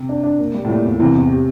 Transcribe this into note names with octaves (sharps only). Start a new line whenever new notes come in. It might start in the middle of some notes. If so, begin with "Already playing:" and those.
Already playing: C3
D4
D4
A#2
G3
A2
A#2 G3
E2
C3 E3
E2
G4